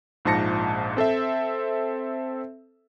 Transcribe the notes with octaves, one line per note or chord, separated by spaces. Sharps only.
A#1 G#2 F3 A5 A#6 C#7
C4 A4 C5 E5